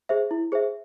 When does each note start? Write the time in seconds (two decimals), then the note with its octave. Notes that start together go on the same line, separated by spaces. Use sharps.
0.09 G#4 C5 E5
0.31 E4
0.52 G#4 C5 E5